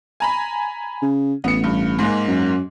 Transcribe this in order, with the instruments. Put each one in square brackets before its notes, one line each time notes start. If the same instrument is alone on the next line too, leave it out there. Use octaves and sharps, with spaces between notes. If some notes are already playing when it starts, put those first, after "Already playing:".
[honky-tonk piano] G#5 A#5 B5
[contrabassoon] C#3
[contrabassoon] A1 [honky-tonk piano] B3 C#7
[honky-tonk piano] G2
G#2 G#3 A#3
[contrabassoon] F#2